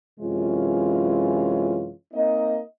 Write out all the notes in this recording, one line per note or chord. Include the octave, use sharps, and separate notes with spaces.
F#2 C3 E3 G#3 C#4 F4
A#3 C4 D#4 D#5